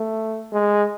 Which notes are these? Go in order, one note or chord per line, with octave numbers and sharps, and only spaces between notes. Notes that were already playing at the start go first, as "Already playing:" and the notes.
Already playing: A3
G#3